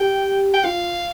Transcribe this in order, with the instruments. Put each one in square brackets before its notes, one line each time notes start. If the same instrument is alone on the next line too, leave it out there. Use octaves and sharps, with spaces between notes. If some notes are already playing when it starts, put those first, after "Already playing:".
Already playing: [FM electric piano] G4 [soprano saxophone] G5
[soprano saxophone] G5
[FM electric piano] F4 [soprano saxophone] F5